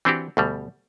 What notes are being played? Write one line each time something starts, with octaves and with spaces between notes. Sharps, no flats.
E3 C4 D4 F#4 G4
D2 B2 G3